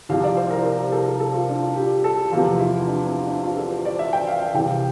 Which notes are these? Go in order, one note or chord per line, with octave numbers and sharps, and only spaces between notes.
C2 C3 F3 F5
D5
C5
A#4
A#4
G4
A4
A4
A#4
A4
F4
D4
F4
G4
A4
E2 C3 F3 F4
E4
D4
C4
D4
F4
A4
C5
D5
E5
G5
F5
F5
C2 C3 E3 G5